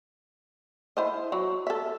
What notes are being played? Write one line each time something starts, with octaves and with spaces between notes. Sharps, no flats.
E4 C5 D#5
F#3
A4 E5